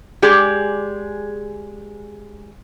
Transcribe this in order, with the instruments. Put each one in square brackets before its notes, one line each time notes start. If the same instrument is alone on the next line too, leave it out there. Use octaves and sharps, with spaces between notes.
[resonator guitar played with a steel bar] G#3 G4 G#4 D5